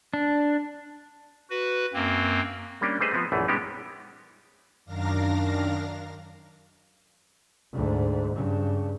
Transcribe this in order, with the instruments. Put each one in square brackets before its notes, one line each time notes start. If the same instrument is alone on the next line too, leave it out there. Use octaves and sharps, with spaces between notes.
[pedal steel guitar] D4
[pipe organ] F#4 B4
F#2 A#3 C4
[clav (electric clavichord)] G3 A#3 C#4 D4
G3 A3 G#4 B4 C5 D#5
F3 B3 C4
A#1 F#2 E3 A3
G3 G#3 B3 C#4 D#4 G4
[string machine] F#2 D#3 D4 A#4 F5 A#6
[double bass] D2 G#2
G2 C#3